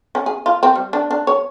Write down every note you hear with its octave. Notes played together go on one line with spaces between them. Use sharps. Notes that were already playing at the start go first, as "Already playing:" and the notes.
C#4
G#4
F4
C4
G3
D4
D4
C#5